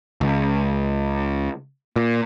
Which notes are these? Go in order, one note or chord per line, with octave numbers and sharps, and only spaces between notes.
C#2
A#2